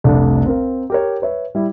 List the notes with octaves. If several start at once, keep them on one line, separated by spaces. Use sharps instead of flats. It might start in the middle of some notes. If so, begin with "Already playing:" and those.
F1 C2 A3 D4
C4 A#4 F5
G4 A#4 C#5
B4 C#5 E5
G3 E4